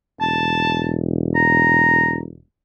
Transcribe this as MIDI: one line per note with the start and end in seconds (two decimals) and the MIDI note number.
0.21 2.39 28
0.21 0.90 81
1.35 2.16 82